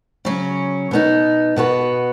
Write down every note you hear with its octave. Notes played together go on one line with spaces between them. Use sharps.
C#3 F#3 C#4
B2 B3 D#4
B2 B3 F#4 B4